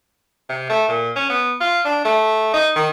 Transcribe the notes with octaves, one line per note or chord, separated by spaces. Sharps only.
C3
A3
A#2
C#4
B3
F4
D4
A3
D#4
D#3